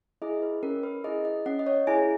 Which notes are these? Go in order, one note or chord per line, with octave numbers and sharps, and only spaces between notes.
E4 G#4 D#5
B4
C#4 A#4
B4
E4 G#4 D#5
D#5
C#4 F#5
D#5
C#5
E4 G#4 G#5